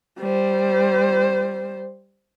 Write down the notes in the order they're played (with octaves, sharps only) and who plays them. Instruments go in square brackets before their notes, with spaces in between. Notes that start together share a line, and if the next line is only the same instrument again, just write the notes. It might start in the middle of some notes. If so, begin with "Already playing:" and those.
[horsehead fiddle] G3 C5